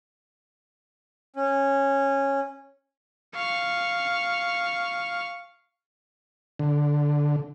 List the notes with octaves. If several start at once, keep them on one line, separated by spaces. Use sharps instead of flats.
C#4
F5 C#6
D3